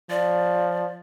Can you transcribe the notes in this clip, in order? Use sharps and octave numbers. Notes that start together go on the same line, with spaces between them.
F3 D5